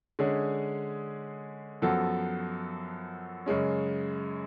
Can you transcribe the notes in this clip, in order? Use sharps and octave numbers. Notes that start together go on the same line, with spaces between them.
D3 G#3 C#4 G#4
F#2 F3 B3 F#4 A4
F#2 C#3 G#3 C#4